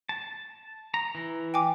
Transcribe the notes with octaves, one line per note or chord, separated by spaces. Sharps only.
A5
A#5
E3
G5 G#5 D6